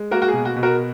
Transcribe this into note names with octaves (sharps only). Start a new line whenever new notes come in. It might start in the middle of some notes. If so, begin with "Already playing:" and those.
Already playing: G#3
A#3 F#4 A#4
F#4
G#4
B2
F#4
B2
F#4 A#4